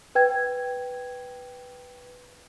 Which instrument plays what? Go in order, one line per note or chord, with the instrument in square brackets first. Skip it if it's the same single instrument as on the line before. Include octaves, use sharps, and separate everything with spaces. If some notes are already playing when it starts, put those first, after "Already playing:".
[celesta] B4 G5 G#6